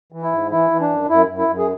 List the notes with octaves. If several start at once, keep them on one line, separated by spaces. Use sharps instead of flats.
E3
E4
G#2
E3 E4
E3
D4
F#2
F#2 E4
F#2
E4
F#2
G#4